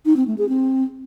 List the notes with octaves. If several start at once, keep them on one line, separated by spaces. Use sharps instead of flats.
D#4
C4
A3
G#4
C4